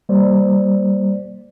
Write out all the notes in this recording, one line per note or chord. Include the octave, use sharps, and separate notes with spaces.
G3 A#3 C5 D5